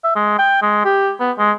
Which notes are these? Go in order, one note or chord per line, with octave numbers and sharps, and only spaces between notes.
E5
G#3
G5
G#3
G4
B3
G#3